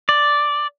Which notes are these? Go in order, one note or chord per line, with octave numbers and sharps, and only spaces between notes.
D5